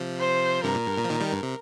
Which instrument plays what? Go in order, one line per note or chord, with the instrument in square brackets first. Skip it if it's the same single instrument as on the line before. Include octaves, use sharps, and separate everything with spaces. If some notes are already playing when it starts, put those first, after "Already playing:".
Already playing: [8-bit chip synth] C3 F3
[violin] C5
[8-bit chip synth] G2 C3 [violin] A#4
[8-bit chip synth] A#2
G2
A#2
F3
A#2 D#3
D#3 G3
G2
C3